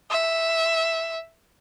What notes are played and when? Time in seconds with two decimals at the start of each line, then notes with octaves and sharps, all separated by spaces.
0.10 E5